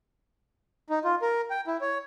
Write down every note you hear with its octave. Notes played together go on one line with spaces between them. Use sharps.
D#4
F4
A#4
G5
E4
C#5